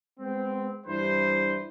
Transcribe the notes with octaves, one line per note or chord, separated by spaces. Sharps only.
G#3 B3 C4
G2 E3 D4 B4 C5